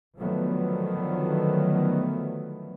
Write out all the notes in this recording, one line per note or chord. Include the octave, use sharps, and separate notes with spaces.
D3 D#3 F3 F#3 A3 B3